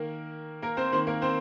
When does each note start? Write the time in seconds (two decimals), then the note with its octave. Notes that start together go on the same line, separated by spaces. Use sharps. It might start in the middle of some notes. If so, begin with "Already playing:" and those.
Already playing: D#3 A#3 A#4
0.62 A#3 A#4
0.77 C4 C5
0.92 D#3 A#3 C4 C5
1.07 A#3 A#4
1.22 C4 C5